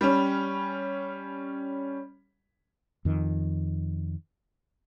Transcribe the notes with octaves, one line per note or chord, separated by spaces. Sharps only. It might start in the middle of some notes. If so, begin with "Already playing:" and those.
G3 C#4
F2 D#3